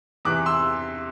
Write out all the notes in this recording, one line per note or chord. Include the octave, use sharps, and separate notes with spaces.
E2 C3 E3 D6 F#6
C6 E6